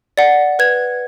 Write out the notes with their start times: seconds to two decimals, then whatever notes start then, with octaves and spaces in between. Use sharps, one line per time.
0.17 D5 F#5
0.59 B4 G#6